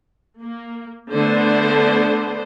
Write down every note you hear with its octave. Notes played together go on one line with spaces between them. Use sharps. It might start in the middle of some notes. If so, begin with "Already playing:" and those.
A#3
D3 A3 B3 D4 C5